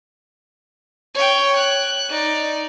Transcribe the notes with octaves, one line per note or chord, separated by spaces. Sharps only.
C#5 G5
F#6
D#4 D5